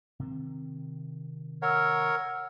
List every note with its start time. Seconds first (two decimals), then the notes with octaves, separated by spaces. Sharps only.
0.20 C3 D#3 C4
1.62 A#4 C#5 F#5 E6 F6